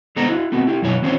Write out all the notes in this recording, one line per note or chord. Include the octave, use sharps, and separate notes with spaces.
G#3 B3 A4 C5 D#5 A#5
E4 F#4
A3 B3 C4 F#4
E4 G4
F#2 B2 F#3 E4 C#5 G#5
E3 C4 C#4 F4 C5 C#5